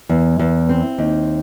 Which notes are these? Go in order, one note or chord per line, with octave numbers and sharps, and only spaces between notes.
E2
E2
C4
D#2